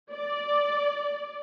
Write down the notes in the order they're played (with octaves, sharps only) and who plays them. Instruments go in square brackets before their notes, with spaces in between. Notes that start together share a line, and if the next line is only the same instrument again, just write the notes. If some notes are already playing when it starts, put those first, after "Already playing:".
[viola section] D5